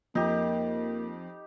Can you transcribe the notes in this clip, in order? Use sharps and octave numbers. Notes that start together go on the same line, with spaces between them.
F2 A#3 D#4 G4